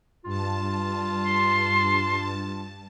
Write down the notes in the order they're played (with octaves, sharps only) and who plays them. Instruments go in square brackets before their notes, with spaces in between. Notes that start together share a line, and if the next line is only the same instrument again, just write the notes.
[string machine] G2 A5 [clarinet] F4
[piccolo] C6